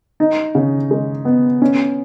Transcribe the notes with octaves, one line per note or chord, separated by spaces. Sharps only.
D#4
C#3
G#3
B3
C#4